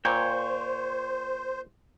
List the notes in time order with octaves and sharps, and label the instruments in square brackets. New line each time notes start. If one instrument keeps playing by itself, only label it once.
[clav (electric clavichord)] A#2 [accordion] C5 [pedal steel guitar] C#5 G5